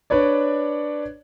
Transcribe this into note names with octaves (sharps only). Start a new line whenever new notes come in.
D4 B4 C#5 D5